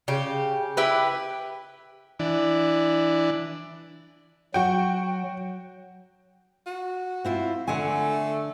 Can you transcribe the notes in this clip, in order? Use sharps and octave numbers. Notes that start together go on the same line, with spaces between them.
C#3 G4
E4 G4 B4
E3 D4
F#3 F#4 G5
F#4
C4 E4 F4
D3 A3 F#5 G#5